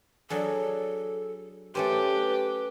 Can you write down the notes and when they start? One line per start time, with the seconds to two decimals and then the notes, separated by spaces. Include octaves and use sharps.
0.30 F#3 D4 G#4 A4
1.75 A3 C#4 G4 B4 C5